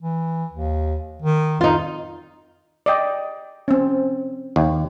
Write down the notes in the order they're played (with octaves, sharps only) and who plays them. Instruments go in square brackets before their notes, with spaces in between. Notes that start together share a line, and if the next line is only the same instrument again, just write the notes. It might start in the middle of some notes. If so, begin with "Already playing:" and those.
[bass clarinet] E3
D#2
D#3
[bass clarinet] F2 [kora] D#4 F4
[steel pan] D5 D#5 G5
C4 C#4
[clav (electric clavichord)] D#2